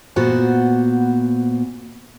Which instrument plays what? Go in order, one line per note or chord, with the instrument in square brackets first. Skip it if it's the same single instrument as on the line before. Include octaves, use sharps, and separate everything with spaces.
[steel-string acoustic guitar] A#2 B3 F#4 C5 F#5